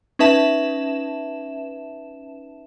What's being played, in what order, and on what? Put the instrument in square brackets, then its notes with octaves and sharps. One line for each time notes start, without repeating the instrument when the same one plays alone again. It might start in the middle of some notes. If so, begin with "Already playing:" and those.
[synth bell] C#4 D#4 B4 E5 A5 E7